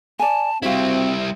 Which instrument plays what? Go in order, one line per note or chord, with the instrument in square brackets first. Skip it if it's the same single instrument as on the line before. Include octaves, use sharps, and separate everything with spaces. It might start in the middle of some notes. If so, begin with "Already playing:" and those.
[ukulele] D5 G#5 [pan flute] A5
[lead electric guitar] G3 E4 [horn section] C4 [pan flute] F#4 [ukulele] E5 F5